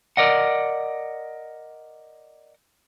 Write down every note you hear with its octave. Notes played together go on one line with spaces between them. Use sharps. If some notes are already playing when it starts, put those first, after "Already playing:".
A#4 D5 D#5 F#5